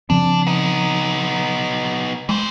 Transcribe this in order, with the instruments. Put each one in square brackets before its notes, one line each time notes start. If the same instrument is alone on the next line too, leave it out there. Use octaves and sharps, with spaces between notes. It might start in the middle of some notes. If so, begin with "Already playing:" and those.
[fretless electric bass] C#3 F3 C4 [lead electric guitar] D4
[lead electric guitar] B3 D#4
[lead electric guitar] E3 C5 [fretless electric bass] G#3